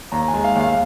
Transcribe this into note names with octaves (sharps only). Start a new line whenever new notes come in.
D#2 A#5
G#5
G#3
F5
D#2
F5